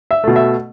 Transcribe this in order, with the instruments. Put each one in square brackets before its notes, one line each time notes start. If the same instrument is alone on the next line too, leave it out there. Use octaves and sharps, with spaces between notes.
[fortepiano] E5
B2 A3
E5